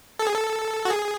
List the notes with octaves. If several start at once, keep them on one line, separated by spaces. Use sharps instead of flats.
A4
G#4
A4
F#4
G#4